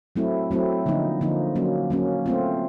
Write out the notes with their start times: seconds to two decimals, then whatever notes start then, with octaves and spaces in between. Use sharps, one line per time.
0.16 F#3 A3 C4 E4
0.51 F#3 A3 C4 E4
0.86 D3 F3 A#3 D#4
1.21 D3 F3 A#3 D#4
1.56 F#3 A#3 C#4
1.90 F#3 A#3 C#4
2.26 A3 C4 F4